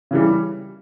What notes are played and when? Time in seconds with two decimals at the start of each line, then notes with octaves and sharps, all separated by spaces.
0.11 C#3 E3 G3